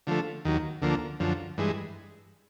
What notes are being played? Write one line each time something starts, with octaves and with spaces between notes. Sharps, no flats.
D3 F3 A3
D#2 D#3 F#3
D2 D3 F3 A#3
F#2 D3 F3
G2 E3 G#3